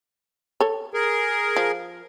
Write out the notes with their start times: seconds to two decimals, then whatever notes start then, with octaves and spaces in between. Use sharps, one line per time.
0.60 A4 C#5
0.94 G#4 A#4
1.56 F3